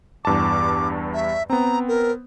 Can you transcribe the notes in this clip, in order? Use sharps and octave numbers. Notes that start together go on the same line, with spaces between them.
E2 G2 A5 D6
E5
B3 C4 A#5
A#4